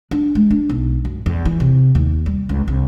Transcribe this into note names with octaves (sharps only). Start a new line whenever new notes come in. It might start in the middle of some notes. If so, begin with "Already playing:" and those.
D4
G#3
D4
B1
F#2
E2
E3
C3
D#2
G3
C#2
C2